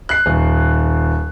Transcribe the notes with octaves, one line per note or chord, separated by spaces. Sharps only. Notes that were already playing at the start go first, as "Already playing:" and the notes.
F#6 C7
D#1